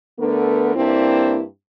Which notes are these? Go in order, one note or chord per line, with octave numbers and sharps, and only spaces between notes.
D3 A3 B3 A#4 B4
G2 A#3 C4 D4 E4